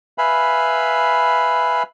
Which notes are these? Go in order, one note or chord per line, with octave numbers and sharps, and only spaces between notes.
B4 E5 F5 G#5 B5